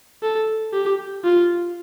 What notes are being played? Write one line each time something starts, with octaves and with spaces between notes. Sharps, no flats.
A4
G4
F4